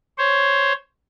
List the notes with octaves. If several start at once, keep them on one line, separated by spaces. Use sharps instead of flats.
C5 C#5